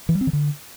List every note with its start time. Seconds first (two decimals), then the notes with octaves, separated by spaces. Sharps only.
0.09 E3
0.15 G3
0.21 C4
0.27 D#3
0.33 D3